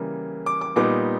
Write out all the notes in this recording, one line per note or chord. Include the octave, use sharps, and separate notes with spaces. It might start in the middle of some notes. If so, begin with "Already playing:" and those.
Already playing: C#3 E3 G3 A#3
D6
D6
A#2 G3 B3 D#4 D6